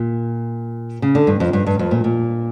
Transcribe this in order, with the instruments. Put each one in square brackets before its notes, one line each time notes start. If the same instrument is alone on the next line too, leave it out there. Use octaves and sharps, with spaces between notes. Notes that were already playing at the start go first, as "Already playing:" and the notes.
Already playing: [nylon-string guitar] A#2
C#3
D3
G2
F2
G2
G2
F2
A#2
A#2